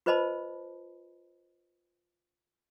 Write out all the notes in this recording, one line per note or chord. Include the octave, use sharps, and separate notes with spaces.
F4 B4 C5 D#5 A5 B5